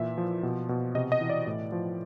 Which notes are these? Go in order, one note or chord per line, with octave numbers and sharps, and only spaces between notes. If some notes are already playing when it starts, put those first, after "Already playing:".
Already playing: A#2 E3 E5
F3
B2
B2
C3 D#5
D#5
E3
D5
A2
F3